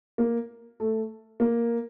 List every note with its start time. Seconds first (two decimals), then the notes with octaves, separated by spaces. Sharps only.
0.18 A#3
0.80 A3
1.40 A#3